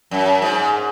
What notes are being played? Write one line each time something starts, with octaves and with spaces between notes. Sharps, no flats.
F#2
G#2